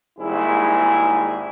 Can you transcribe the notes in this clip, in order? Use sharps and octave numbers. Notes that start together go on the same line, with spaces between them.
G#1 G#2 G3 A#3 E4 G#4